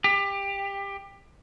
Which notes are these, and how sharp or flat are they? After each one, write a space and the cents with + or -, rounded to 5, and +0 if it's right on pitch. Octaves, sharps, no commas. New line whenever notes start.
G4 +20